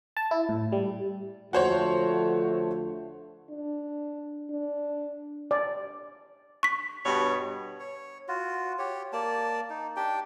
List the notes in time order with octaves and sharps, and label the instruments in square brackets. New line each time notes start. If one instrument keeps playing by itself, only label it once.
[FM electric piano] A5
E4
A2
G3
[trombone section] D3 F3 A3 [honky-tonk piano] F#4 C5 C#5
[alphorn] D4
D4
[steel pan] D5
[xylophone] C#6 B6
[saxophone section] G2 B2 C#5
[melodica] C#5
F4 F#4
G4 C#5
A#3 D5 A5
D#4
D4 G4 G5